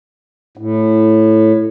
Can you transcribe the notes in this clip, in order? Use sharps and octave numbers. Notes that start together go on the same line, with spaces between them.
A2